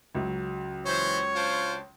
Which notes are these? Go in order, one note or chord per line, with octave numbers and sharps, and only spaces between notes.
C#2 F#3
E3 C5 C#5
D4 F4 C5